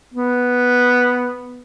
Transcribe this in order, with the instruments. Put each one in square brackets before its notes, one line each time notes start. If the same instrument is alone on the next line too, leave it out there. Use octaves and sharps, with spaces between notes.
[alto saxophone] B3